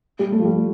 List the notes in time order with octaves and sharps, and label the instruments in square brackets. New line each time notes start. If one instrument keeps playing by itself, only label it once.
[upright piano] G3
A3
F3
G3